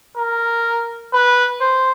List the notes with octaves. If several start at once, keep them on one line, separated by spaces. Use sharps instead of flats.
A#4
B4
C5